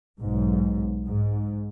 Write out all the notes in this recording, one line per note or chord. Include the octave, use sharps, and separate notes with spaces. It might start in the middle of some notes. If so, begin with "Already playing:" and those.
B1 G#2
G#2